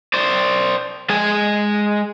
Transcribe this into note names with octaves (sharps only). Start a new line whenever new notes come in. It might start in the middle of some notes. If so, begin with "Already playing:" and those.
C5 D5
G#3 G#5